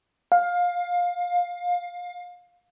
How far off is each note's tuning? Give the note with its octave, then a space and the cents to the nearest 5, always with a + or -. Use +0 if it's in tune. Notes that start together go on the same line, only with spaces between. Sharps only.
F5 +20